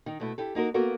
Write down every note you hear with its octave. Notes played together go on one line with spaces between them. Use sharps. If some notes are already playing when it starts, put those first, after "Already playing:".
D#3 D#4
B2 A3 E4
E4 G4 A4
A#3 D#4 F#4 A#4
A#3 B3 F#4 A4 A#4